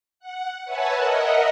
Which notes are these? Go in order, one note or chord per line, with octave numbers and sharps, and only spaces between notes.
F#5
B4 C#5 E5 F#5 G#5 A5
A#4 D#5 E5 F#5